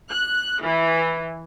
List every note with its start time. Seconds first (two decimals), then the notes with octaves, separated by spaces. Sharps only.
0.11 F#6
0.63 E3